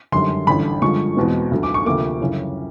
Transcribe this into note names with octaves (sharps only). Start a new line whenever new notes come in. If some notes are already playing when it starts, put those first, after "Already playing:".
G#1 F#2 D3 G3 C6
A1 G2 D3 B5
G2 D3 F3 G#3 C#6
E2 B2 G#3 C4
D2 D3 F#3
D6
C#6
D2 C3 F3 A#3 D6
G1 F#2 C#3 E3